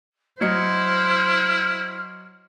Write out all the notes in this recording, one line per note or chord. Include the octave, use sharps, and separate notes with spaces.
F#3 E4 C5 D#5 F6 C#7